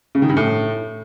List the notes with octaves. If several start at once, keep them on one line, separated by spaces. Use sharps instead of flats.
C#3
D#3
G2
A2